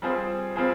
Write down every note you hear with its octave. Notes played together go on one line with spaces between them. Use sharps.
G3 C4 F4 G#4 C5
G3 C4 F4 G#4 C5